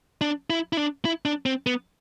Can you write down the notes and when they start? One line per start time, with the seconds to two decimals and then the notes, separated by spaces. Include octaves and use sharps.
0.21 D4
0.50 E4
0.73 E4
0.77 D4
1.05 E4
1.25 D4
1.46 C4
1.67 B3